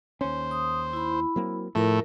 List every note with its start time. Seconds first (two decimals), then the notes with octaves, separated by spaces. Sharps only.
0.21 D#2 C#4 C5
0.51 D#6
0.93 E4 B5
1.36 F#3 A#3 C4
1.75 A2 F3 A3 E4 A#4